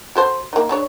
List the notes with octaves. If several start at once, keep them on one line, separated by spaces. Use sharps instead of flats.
F#4 A4 C5
A#3 D#4
G#3 D4 C#5